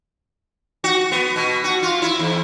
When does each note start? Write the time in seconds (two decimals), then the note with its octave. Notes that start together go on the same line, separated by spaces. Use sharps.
0.84 F#4
1.12 B3
1.36 B2
1.64 F#4
1.83 F4
2.02 E4
2.19 E2